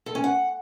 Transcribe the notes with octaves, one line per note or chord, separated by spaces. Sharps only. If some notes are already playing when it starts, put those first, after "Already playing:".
A4
C#4
F#5